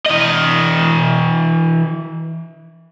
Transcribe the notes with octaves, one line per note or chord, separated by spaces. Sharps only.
E3 D#5